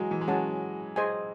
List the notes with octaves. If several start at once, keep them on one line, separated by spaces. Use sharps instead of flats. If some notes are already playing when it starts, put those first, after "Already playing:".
Already playing: E3 F#3 G#3
E3
G#3
F#3 C#4 G#4 C#5 F#5 A5
G#4 C5 D#5 G#5